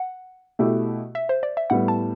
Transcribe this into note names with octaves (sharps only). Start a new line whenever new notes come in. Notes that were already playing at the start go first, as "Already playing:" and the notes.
Already playing: F#5
B2 A3 E4 G4
E5
C5
D5
E5
A2 G3 B3 F#5
A5